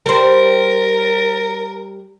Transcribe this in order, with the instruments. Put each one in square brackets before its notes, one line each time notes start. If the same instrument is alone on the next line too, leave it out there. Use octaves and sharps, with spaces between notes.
[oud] G3 G4 C5 [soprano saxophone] A#4